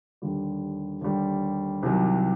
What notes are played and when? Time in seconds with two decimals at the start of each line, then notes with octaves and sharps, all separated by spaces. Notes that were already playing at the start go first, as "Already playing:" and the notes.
0.22 D#2 D3 G3
1.01 D#2 D3 G3
1.83 C2 C3 D#3 F#3